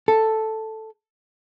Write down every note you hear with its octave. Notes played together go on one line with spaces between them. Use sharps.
A4